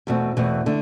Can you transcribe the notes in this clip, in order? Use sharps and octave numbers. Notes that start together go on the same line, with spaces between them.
E2 B2 A3 C4
E2 B2 A3 C4
D3 A3